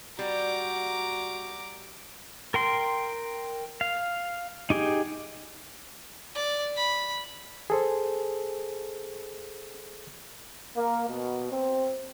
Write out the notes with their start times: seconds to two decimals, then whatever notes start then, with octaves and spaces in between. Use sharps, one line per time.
0.19 G3 F#4 A#5 D6
2.54 A#4 G5 C6
3.81 F5
4.70 D#4 G4 G#4
6.35 D5
6.76 B5
7.70 G#4 A4 C5
10.75 A#3
11.08 B2
11.51 C4